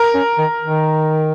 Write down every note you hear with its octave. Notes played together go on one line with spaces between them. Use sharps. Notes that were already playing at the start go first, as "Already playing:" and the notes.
Already playing: A#4
C#4
D#3
D#3